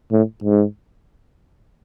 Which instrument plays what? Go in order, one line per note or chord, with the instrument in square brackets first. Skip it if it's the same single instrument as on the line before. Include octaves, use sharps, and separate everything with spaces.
[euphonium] A2
G#2